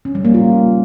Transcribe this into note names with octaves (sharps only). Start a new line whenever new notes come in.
C#4
G3
A#3
F4